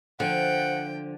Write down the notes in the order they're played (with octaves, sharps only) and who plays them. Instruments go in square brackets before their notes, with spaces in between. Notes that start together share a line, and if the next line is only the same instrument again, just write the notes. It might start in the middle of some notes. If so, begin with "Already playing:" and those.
[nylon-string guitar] D3 [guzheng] F3 [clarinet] F#5 [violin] G5